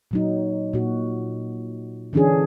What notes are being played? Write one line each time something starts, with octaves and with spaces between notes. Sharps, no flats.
A#2 F#3 D#4
A#2 F#4
D3 E3 C#4 D4 G#4